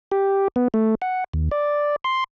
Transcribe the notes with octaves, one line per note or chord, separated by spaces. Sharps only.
G4
B3
A3
F#5
D#2
D5
C6